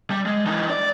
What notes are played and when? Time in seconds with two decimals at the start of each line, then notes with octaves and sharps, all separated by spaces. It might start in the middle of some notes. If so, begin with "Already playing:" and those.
0.11 G3
0.26 G#3
0.46 E3 D#4
0.70 D5